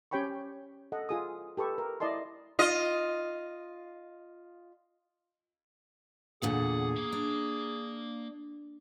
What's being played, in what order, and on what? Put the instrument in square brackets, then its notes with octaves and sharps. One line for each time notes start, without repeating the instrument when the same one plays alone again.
[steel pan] C#4 G4 C#5 G5 B5 C#6
A4 D#5 F#5
F4 G#4 D#6
G4 A4 B4 C#6
A#4
E4 D5 D#5 A5 C6
[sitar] F4 D#5
[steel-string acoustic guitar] E2 A#2 D3 [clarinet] G#4 [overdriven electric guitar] F#5
[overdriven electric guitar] A#3
[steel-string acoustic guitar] D4